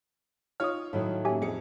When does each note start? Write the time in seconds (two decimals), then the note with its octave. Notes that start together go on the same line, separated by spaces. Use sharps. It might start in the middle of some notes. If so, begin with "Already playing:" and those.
0.60 D#4 F4 C#5 D#6 F6
0.93 A2 D#3 F#3 E4
1.25 A#3 C#4 G4 E5 G#5
1.42 F2 G#4 C#7